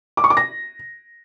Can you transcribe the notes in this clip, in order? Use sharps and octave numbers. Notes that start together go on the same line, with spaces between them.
D6
C#6
D6
A#6